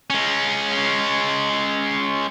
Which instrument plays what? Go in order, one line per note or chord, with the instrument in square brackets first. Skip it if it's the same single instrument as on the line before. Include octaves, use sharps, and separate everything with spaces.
[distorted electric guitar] G#3 C#4